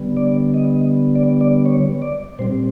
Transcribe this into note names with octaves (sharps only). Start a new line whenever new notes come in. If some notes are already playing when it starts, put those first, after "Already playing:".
Already playing: D3 G3 B3
D5
D#5
D5
D5
C#5
D5
A#2 G3 C4 C5